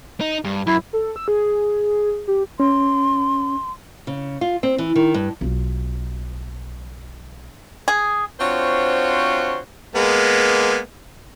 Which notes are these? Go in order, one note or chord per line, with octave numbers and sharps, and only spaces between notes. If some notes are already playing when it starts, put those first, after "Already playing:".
D#4
G2
F#2 E4
A4
E6
G#4
G4
C#4 C6
C#3
F4
C4
E3
D#3
G2
B1 F4
G#4
C4 D4 F4 F#4 C5 C#5
G#3 A#3 B3